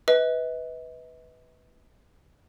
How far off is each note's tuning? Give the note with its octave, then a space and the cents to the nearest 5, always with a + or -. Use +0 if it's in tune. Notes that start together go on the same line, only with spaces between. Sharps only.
B4 +0 D#5 +45